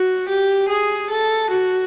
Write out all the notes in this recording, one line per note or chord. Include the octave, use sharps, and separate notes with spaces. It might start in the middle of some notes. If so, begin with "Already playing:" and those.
Already playing: F#4
G4
G#4
A4
F#4